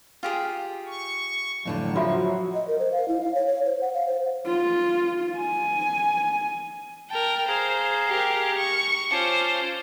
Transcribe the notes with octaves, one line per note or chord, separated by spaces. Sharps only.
F4 G4 G#4
C#6
F2 A2 D3 F#3
F3 F4 F#4 E5
D#5
A#4
C5
F5
E4
F5
C#5
C#5
C5
F#5
F5
C5
F4
G#5
A#4 G5 A5
G#4 C5 F5 A#5
G4 A#4
C#6
C#4 F4 C5 A5 D6